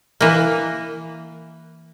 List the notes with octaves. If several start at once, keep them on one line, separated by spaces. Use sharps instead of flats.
E3 A#3